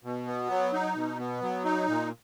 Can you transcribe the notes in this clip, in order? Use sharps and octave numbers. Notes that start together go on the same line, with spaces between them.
B2
B3
F#3
D#4
B2
B3
F#3
D#4
A#2